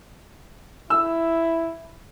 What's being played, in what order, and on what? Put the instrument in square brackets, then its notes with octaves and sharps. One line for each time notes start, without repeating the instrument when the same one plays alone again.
[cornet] E4 [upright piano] E6